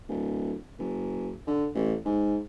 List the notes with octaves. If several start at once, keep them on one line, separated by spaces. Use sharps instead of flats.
D1
F#1
D3
A1
G#2